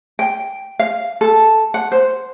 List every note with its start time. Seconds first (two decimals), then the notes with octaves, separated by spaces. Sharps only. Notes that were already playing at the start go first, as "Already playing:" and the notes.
0.19 G5
0.79 F5
1.21 A4
1.74 F#5
1.92 C5